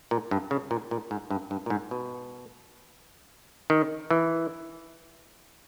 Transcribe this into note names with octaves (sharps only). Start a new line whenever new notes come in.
A#2
G2
C#3
A#2
A#2
G#2
G2
G2
A#2
G#2
B2
D#3
E3